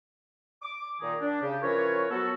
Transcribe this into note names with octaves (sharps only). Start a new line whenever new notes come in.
D6
A#2 D#3 D#4 G#4
D4
C#3 G4
E3 F3 C#4 A#4 B4 C#5
F#3 B3 F#4 A4